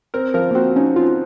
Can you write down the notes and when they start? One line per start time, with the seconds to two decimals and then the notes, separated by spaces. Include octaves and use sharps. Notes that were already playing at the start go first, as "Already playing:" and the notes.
0.14 C4 A#4
0.34 F3 A#4
0.51 A#3
0.55 C4 F#4
0.76 C#4 D#4
0.96 C4 F4